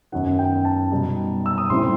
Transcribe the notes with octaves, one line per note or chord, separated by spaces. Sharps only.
F#2 D#3 F#3 B3 D#4 F#5
G5
A5
B2 G3 D#4
E6
D#6
A2 G3 C4 E4 C6